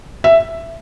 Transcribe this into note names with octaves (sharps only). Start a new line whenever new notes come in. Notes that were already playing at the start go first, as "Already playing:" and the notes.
E5